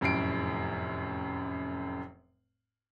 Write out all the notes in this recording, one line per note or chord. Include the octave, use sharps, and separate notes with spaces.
F1 F#2 A2 C7 D7